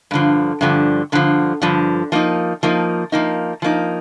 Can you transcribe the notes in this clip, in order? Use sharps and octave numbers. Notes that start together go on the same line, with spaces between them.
G2 D3 F3
G2 D3 F3
G2 D3 F3
G2 D3 F3
F3 A#3 D#4
F3 A#3 D#4
F3 A#3 D#4
F3 A#3 D#4